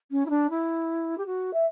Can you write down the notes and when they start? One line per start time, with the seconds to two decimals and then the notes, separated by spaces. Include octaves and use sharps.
0.11 C#4
0.25 E4
0.29 D4
0.50 E4
1.17 G4
1.26 F#4
1.53 E5